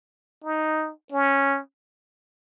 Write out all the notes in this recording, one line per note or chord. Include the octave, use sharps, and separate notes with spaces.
D#4
C#4